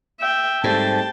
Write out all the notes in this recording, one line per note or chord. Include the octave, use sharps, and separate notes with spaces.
E5 G5
G#2 G3 A3 C4 G5 A5